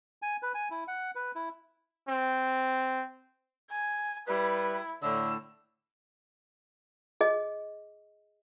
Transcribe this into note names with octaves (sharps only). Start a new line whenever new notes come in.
G#5
B4
G#5
E4
F#5
B4
E4
C4
G#5
G3 E4 B4
A2 D3 E6
G#4 D#5